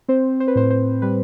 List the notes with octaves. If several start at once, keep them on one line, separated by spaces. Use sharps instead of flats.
C4 C5
C5
B4
A2 C5
C5
G3 B4